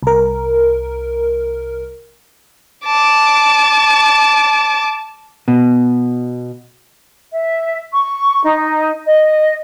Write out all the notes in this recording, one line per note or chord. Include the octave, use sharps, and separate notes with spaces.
C2 A#4
A5 D6
B2
E5
C#6
D#4
D#5